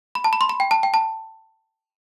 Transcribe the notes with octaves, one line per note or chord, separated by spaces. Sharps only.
B5
A5
B5
C6
B5
G5
A5
G5
A5